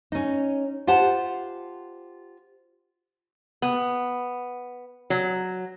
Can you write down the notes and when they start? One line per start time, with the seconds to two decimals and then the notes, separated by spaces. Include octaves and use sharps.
0.12 C#4 D#4
0.87 F4 G4 C5 F#5 A5
3.62 B3
5.10 F#3